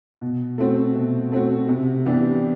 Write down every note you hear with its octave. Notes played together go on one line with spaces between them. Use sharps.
B2
A3 C4 F#4
B2
A3 C4 F#4
C3
E3 B3 D4 G4